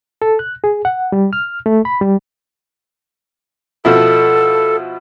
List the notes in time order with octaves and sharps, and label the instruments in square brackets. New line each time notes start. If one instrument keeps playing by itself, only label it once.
[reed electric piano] A4
F#6
G#4
F#5
G3
F6
A3
B5
G3
[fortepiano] B2 F3 E4 [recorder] A4